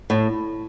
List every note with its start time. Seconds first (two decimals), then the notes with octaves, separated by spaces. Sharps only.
0.10 A2